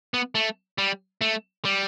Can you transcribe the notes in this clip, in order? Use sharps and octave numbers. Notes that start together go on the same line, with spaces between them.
B3
A3
G3
A3
G3